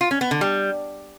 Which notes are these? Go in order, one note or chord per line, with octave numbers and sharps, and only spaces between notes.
F4
C#4
B3
D3
G3